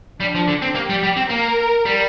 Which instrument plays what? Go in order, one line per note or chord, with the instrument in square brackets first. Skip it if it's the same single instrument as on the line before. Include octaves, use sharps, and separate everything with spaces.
[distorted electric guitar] G3 [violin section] D4
[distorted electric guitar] F3
D3
C4
[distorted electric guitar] A#3 [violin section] G4
[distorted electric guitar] G3
G3
C4
[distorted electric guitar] A#3 [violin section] A#4
[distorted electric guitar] G3